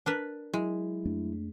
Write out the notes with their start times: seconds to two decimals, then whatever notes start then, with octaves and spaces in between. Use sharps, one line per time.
0.06 D4 A#4 B4
0.54 F#3 G#3 E4
1.05 F2 A3 D4